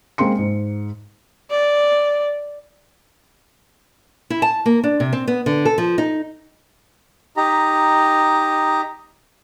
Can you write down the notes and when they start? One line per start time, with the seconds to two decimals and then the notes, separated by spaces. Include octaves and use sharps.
0.18 G#3 A#3 C4 C6 C#7
0.39 G#2
1.50 D5
4.30 E4
4.42 A5
4.66 A#3
4.83 D4
5.00 C3
5.13 C4
5.28 B3
5.46 D3
5.65 A4
5.78 F3
5.98 D#4
7.37 D#4 G4 A#5